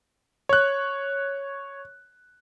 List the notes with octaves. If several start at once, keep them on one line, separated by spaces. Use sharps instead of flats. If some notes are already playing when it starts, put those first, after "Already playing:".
C#5 F#6